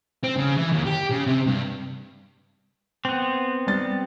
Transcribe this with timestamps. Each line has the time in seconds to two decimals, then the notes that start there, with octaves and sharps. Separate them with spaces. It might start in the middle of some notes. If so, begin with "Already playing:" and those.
0.23 C4
0.37 C#3
0.57 E3
0.72 D#2
0.86 G4
1.10 C#3
1.27 C3
1.47 G2
3.05 B3 C4
3.67 G3 A6